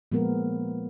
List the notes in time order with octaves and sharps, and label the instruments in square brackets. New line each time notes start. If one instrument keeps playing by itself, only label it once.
[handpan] A#2 F3 G#3 B3 A#4